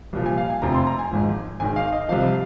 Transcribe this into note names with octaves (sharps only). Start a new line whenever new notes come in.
C2 A#2 F3
G#5
F5
G#5
F1 F2 C3 F3 A#5
C6
A#5
G#5
G#1 G#2 F3
G#1 G#2 D#3 G#5
F5
D#5
C2 C3 F3 F5